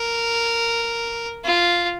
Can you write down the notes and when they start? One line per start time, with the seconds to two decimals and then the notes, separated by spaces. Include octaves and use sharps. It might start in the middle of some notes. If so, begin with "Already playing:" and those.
Already playing: A#4
1.45 F4